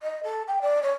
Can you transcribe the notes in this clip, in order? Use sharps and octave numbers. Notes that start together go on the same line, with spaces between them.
D#5
A4
G5
D5
C#5